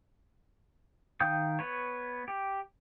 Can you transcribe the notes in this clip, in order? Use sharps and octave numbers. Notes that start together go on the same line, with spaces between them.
D#3 F5 G5 D#6 G6
B3 B4 C#5
G4